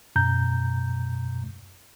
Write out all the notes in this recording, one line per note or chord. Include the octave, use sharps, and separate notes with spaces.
F#2 B2 A#5 G6